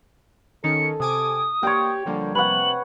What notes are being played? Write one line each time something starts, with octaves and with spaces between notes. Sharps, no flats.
D#3 C#4 D#4 A4 C#7
C3 G#5 D6 D#6
A#3 G4 C#5 D5 G5
D3 F3 G3 A#3
C3 B4 C#5 F#5 F#7